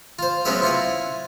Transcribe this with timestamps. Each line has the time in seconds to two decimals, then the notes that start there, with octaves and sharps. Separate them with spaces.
0.19 F4 C5
0.45 F#3 G#3 B3 C#4 C5 E5
0.62 E4 F4 F#5 G#5